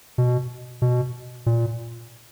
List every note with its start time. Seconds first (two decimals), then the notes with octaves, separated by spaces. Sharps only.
0.18 B2
0.82 B2
1.46 A#2